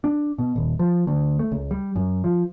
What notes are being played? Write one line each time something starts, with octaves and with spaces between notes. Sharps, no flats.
D4
B2
D#1
F3
D2
A3
C#2
G3
F#2
F3